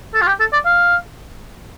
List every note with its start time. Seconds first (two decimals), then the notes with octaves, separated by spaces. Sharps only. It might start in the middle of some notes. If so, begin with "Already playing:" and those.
0.14 A4
0.22 F4
0.27 G4
0.40 A4
0.53 D5
0.66 F5